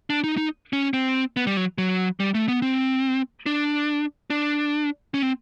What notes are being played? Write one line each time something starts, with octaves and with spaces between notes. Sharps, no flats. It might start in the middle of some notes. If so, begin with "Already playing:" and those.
D4
D#4
D#4
C#4
C4
B3
G3
F#3
F#3
G3
A3
B3
C4
D4
D4
C#4
C4